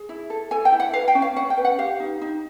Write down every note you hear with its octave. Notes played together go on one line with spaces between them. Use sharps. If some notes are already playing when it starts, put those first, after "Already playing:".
Already playing: G#4
E4
A4
A4 G#5
G5
E4
F#5
B4 F5
G5
C#4
F5
C#4 F#5
G5
B4
F#5
G4 F5
D#4
D#4